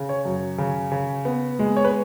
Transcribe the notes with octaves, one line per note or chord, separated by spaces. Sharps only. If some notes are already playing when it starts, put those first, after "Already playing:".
Already playing: C#3
C#5
F#2
C#3
C#3
B3
G#3
C#5
B4